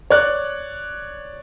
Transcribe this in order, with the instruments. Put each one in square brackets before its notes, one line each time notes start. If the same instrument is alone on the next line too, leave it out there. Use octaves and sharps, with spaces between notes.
[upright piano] C#5 D5 F#6